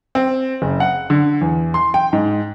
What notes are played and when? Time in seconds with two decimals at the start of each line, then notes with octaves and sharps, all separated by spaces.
0.15 C4
0.62 F#1
0.80 F#5
1.10 D3
1.41 E2
1.74 C6
1.94 G5
2.13 G#2